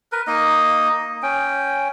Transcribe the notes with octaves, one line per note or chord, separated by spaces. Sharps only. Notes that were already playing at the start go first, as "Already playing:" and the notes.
A#4 B4
A#3 D#4 D#5
C#4 G5